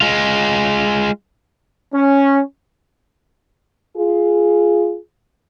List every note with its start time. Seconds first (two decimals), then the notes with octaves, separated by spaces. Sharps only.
0.01 G#3 F4
1.94 C#4
3.97 F4 G#4